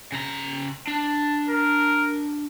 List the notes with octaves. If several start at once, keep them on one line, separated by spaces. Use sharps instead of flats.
C#3 A#5
D4 A5
A#4